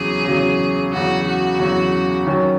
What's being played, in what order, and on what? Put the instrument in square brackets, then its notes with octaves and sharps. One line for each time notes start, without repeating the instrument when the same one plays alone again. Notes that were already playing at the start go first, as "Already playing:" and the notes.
Already playing: [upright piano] E2 C#3 F#3 [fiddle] G#4
[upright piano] E2 C#3 F#3
[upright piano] E2 C#3 F#3 [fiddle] F#4
[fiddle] F#4
[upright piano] E2 C#3 F#3
D#3 F#3 C#4